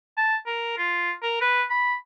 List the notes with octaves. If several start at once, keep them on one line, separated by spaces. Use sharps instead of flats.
A5
A#4
F4
A#4
B4
B5